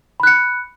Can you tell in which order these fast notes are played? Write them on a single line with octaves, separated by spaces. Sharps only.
B5 F#6 C#7